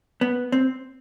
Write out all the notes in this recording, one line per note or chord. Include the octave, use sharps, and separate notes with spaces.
B3
C4